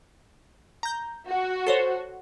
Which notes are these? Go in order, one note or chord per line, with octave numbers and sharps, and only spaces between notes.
A#5 G6
F#4
A4 C5 C#5